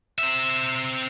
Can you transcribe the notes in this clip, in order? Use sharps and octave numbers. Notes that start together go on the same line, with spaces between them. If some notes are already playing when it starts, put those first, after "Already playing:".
C4 E5